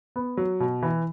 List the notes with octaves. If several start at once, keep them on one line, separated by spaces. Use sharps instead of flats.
B3
F#3
B2
E3